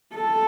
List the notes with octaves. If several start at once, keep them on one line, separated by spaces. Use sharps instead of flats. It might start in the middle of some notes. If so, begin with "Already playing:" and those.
A4